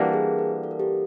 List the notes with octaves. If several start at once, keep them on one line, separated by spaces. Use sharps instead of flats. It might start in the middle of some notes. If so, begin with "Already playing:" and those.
Already playing: E3 G3 A#3 D4 F#4
A4
G#4 A#4
A4 B4
A4
A#4
G4 A4